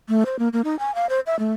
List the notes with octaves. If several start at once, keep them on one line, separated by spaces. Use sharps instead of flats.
A3
C5
A#3
A#3
D#4
G#5
F5
C5
E5
A3